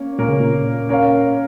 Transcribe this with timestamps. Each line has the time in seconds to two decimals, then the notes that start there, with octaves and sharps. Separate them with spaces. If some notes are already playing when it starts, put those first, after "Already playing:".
Already playing: A#3 C#4
0.19 A#2 A#3 C#4 A#4
0.29 C#3
0.40 A#2
0.89 C#4 A#4 C#5 F5